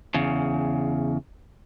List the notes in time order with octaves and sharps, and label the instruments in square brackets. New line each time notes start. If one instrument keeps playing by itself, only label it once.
[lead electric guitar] E2 C#3